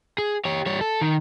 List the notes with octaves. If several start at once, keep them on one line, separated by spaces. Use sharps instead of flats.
G#4
G4 C#5
G3 C#5
A4
D#3